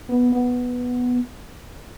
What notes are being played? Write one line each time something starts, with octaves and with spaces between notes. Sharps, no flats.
B3
B3